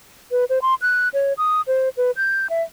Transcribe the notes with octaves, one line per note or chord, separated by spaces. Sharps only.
B4
C5
C6
F#6
C#5
D#6
C5
B4
G6
E5